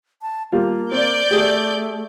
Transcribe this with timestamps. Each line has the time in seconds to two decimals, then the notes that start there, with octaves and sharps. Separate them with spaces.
0.22 A5
0.52 G3 A#3 F4
0.91 C4 D5 G6
1.31 A3 G4 G#4